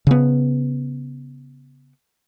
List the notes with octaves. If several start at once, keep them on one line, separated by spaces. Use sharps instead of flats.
C#3 B3